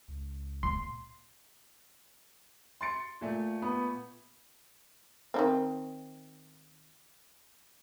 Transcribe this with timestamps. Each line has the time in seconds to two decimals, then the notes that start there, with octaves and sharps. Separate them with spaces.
0.08 C#2
0.63 A#2 C6
2.81 C6 A6 C#7
3.21 A#2 A3
3.62 B3
5.34 D#3 E3 C4